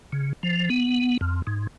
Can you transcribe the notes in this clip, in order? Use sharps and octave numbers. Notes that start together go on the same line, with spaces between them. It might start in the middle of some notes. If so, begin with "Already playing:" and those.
C#3
F3
B3
F2
G#2